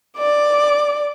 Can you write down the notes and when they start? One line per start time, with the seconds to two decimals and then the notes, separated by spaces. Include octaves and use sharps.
0.18 D5 D6